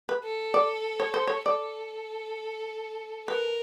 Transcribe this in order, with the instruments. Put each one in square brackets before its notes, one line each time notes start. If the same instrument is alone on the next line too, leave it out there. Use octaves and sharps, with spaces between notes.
[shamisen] B4
[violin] A4
[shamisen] D5
C#5
C5
C#5
[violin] A4 [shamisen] D5
[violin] A#4 [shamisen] B4